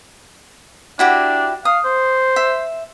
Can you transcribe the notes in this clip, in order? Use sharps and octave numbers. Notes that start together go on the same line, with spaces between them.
D4 E4 F#4 G4
F5 D#6
C5
E5